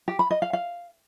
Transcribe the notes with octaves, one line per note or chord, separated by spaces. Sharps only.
G4
B5
D#5
F5
F5